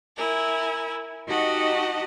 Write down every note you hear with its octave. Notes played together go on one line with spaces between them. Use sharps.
E4 A#4 G#5
D#4 F#4 G4 D#5 F#5 A5